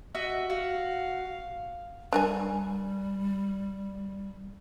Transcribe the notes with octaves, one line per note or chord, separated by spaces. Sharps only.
F#4 D#5 E5
F#4 F5
G3 D4 A#4 G#5